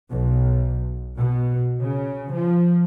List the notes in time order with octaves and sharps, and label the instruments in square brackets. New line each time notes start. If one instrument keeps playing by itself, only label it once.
[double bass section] B1
B2
C#3
F3